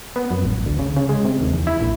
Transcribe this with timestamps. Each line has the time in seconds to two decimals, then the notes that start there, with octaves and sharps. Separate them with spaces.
0.16 B3
0.31 F#2
0.45 A1
0.66 D2
0.79 C#3
0.97 C#3
1.09 G#3
1.25 C3
1.41 D#2
1.54 E2
1.67 E4
1.81 A#1